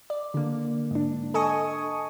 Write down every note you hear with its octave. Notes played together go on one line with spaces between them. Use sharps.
D5
D3 A#3
G#2 D4
A4 D#5 G#5 C#6 D#6